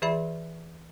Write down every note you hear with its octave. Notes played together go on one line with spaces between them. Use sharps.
E3 G#4 D5 E5 B5